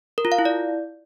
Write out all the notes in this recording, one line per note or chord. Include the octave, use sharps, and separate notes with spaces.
A#4
F4
F5
E4
D5